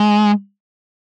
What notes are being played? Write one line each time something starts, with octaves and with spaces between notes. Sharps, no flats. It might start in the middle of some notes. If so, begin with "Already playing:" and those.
Already playing: G#3